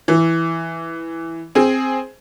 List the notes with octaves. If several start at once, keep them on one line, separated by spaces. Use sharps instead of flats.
E3
C4 G#4